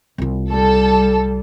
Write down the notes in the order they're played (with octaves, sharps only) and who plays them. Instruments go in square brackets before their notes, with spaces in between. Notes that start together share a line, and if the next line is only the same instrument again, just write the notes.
[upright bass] C2 F4
[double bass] G3 [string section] A4